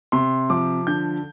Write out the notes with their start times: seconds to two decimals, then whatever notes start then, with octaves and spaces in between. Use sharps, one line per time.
0.12 C3 C6
0.50 F3 D6
0.87 D3 G6